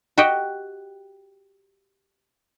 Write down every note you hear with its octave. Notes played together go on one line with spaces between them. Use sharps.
F#4 G4 D#5 G5